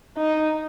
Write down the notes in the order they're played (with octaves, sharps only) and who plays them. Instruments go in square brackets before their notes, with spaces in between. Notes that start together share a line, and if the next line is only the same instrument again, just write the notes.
[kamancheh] D#4